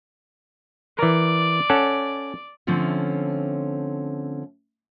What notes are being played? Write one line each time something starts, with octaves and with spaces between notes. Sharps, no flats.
E3 A#4 D5
C#4 A4 F#5
D3 F3 A3 C4 C#4